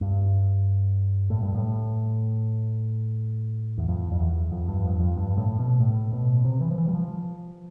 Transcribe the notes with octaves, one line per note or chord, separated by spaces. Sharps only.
G2
A2
G2
A2
E2
F2
F2
E2
F2
G2
F2
F2
G2
A2
B2
A2
B2
C3
E3
F3
E3
G3
F3